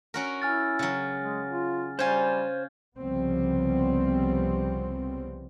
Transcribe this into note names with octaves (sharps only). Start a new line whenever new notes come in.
C#4 F#4 A#4
E4 G#5 F6 A6
C#3 F#3
G#3
F4
G3 C#4 F4 C5 G#5 G6 G#6
C2 C#3 F3 G3 B3 C4